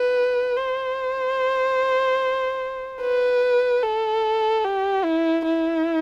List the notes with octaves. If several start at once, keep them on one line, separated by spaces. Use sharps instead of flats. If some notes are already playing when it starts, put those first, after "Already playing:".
Already playing: B4
C5
B4
A4
G4
E4
E4